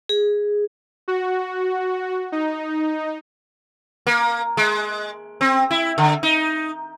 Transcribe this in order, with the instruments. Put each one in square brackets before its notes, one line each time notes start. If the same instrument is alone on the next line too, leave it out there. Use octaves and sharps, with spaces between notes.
[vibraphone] G#4
[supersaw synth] F#4
D#4
[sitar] A#3
G#3
C4
E4
D3
D#4